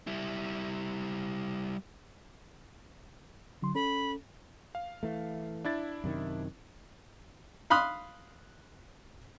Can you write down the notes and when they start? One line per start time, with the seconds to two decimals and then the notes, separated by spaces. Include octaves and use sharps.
0.07 G3 E4
3.62 D3 F#3 C6
3.75 C#4 A4 B5
4.75 F5
5.03 E3 A3
5.65 D4 E4 A6
6.04 F#2 C3 D#3
7.70 F5 B5 C6 D#6 F#6